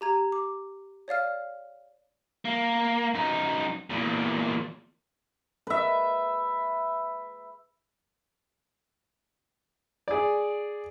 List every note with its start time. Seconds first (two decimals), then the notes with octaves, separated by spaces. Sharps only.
0.01 G4 A#5 G#6
0.32 D6
1.08 C#5 D5 F5 F6
2.45 A#3
3.14 F#2 D#4
3.90 E2 A#2
5.67 B4 E5
10.08 G#4 D5